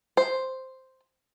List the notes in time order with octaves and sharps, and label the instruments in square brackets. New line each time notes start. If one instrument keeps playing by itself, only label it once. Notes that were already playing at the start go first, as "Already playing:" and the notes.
[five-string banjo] C5